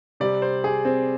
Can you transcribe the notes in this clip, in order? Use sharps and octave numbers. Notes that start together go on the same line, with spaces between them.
C3 G3 D5
C5
G#4
C4